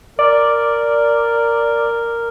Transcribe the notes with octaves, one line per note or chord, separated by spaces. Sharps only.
A#4 D5